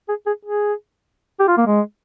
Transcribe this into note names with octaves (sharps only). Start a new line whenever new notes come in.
G#4
G#4
G#4
G4
F4
A#3
G#3